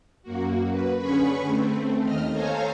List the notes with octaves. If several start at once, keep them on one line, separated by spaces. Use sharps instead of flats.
F#2 A#3 F#4
B4
D3 C#4 G#4 B4 B5 C#6
A3 C4
D#2 D#5 F6
A4 C5 C#5 F5 G#5 A#5